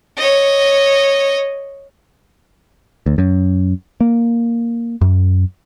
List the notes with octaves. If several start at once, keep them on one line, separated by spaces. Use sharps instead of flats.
C#5 D#5
D2
F#2
A#3
F#2